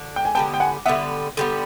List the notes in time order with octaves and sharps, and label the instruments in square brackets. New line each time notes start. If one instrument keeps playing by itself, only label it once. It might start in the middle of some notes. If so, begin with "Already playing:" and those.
Already playing: [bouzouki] D3
[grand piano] G5
G#5
[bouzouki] D3 G3 B3 [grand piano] G5 A5
[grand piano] G5
F#5 G#5
[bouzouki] D3 G3 B3 [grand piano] E5 F#5
[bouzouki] D3 G3 B3